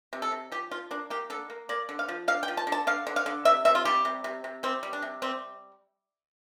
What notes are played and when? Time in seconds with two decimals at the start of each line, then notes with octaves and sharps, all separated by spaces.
0.13 C3
0.22 A4
0.32 C3
0.52 F3 G4
0.71 F3 F4
0.91 A#3 D4
1.10 A#3 G4
1.30 D3 A4
1.50 A#3
1.69 A#3 D5
1.89 D3
1.99 F5
2.08 F3
2.28 D3 F5
2.43 G5
2.48 F3
2.57 A5
2.67 D3
2.72 A5
2.87 D3 F5
3.07 D3
3.16 F5
3.26 D3
3.45 C3 E5
3.65 C3 E5
3.75 F4
3.85 G3 G4
4.05 C3
4.24 C3
4.44 C3
4.63 G3 C4
4.83 G3
4.93 D4
5.02 C3
5.22 G3 C4